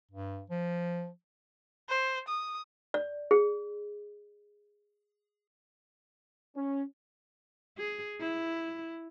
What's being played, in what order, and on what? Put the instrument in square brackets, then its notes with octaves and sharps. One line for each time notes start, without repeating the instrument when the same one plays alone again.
[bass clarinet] G2
F3
[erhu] C5
D#6
[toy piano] D5
G#4
[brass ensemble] C#4
[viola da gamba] G#4
E4